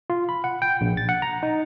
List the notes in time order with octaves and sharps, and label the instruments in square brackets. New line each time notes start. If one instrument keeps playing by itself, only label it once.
[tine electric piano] F4
B5
F#5
G5
A#1
A6
F#5
A#5
D#4